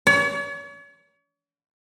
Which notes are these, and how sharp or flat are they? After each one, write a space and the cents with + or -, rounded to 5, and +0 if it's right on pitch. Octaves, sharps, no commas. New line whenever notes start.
C#5 +40